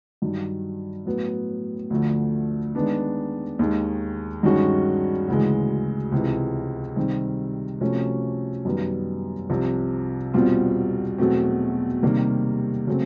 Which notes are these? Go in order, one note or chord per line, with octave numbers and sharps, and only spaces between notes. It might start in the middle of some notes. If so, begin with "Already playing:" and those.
G2 D#3 F#3
A2 F#3 B3
D2 D3 F3 A3
D#3 G#3 B3 D4
D#2 D#3 G#3
G2 D#3 G#3 C#4 F#4
D2 C#3 E3 G#3
C#2 C3 E3
C3 D#3 G3 C4
C3 F3 A3 C#4 F#4
F#2 D#3 G3 B3
C2 C3 F3
E2 B2 G3 C4 F4
E2 B2 F#3 A3 C4
C3 D#3 G3 A#3
C#3 F#3 A3 C4